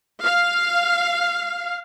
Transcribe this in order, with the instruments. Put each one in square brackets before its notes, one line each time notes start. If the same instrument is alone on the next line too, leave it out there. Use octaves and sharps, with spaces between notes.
[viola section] F5